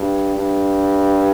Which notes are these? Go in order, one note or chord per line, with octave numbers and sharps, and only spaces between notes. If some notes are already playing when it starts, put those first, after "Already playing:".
Already playing: G2
G2